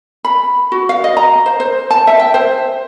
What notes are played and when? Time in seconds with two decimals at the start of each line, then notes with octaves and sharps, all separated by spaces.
0.25 B5
0.72 F#4
0.89 F5
1.04 D#5
1.17 A#5
1.46 C5
1.60 C5
1.91 A5
2.07 E5
2.19 G5
2.34 C5